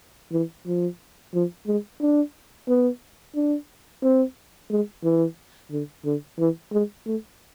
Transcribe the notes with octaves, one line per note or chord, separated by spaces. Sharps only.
E3
F3
F3
G#3
D4
B3
D4
C4
G#3
E3
D3
D3
E3
G#3
A3